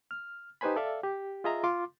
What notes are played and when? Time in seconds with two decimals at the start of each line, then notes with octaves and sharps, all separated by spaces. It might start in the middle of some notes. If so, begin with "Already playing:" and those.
0.11 F6
0.61 D#4 G4 B4 C5 G#5 B5
0.76 A4 D5 E5 F5
1.04 G4
1.44 F4 G#4 D#5 E5 A#5
1.64 F4 C6 D6